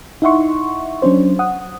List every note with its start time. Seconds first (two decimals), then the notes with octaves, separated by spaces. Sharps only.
0.22 D#4 E4 E5 F#5 C6 C#6
1.02 F#3 C#4 D4 C5
1.39 F#5 D#6